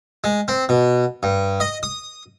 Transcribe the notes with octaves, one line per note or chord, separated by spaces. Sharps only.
G#3
C4
B2
G2
D#5
D#6